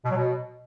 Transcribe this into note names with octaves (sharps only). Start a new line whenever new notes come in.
B2
F#3
B2